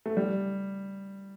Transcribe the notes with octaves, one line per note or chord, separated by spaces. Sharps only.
A3
G3